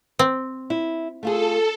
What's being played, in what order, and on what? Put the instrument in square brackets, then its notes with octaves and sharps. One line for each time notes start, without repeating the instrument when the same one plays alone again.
[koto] C4
[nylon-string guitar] E4
[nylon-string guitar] A3 F4 G#4 [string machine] A4